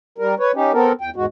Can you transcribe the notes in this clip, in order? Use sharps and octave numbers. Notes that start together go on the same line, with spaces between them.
G3 A#4
B4 C#5
C#4 D#4 G4
B3 C4 A4 A#4
E2 G5
E2 G#2 G#3 F#4